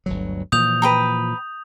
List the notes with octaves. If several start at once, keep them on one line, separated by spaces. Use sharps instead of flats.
G1 D2 F#3
A#2 E3 F3 D#6 G6 F7
B4 G5 A#5